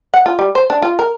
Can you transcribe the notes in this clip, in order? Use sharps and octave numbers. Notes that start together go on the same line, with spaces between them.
F#5
F4
G3
C5
D4
F4
A#4